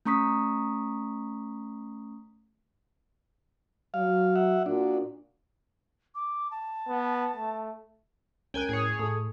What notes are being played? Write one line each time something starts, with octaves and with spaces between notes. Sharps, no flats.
A3 C#4 A#5 C#6 D#6 B6
F#3 F5
E5 F#5
A#2 D4 F#4
D6
A5
B3
A3
C#2 C#4 A#4 G5 G#5 F#6 G#6
A2 G#4 C#5
A2 A4 D#6